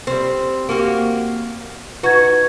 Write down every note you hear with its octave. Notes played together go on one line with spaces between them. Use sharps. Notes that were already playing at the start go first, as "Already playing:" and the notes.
G3 C4
A#3 F#4 G4
D#4 F#4 B4 G#6